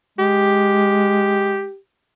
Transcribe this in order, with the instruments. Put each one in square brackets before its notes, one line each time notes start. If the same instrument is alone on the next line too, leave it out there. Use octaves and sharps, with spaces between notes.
[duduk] G#3 [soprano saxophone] G4